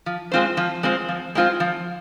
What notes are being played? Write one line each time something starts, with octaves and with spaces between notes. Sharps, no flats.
F3
G#3 C4 F4 C5
F3
G#3 C4 F4 C5
F3
G#3 C4 F4 C5
F3